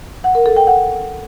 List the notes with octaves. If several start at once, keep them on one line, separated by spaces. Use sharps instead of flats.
F#5
A#4
A4
G5
F#5